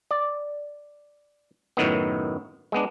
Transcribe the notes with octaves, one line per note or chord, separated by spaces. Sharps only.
D5
F#2 A2 D#3 B3
G#3 B3 D4